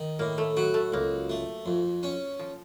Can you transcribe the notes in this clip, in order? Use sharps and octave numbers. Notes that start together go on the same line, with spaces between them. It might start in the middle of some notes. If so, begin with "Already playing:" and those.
Already playing: D#3
A2 A#3
A3
F#3 F#4
A3
C#2 A#3
A3
F2
C#4
F3